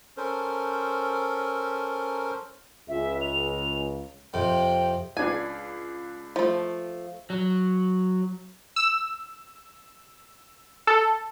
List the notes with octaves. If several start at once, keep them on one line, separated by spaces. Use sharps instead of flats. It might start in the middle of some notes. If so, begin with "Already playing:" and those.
C#4 A4 A#4 C5
C#2 E5
F7
F2 C3 G5
C#2 D4 G#5 G#6
F3 A3
F#3
E6
A4